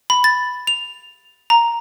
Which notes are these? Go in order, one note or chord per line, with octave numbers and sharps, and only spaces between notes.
B5
A6
F7
A#5